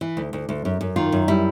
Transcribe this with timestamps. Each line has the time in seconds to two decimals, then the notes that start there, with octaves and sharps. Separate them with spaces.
0.01 E3
0.17 D2
0.33 D2
0.49 D2
0.65 F#2
0.81 F#2
0.96 D#3 F4
1.12 F#2
1.28 G3 E4